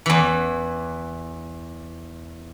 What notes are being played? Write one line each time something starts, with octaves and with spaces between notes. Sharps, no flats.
E2 E3